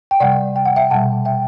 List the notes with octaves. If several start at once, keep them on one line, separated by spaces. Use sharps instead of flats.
G5
C3 G3 D5 F#5
G5
F#5
E5 G5
B2 G3 F#5 A5
E5 G5